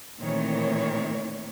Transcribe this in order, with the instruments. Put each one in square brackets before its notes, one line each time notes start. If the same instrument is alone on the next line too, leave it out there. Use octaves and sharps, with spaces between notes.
[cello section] A#2 D#3 E3 A3 C4 C#5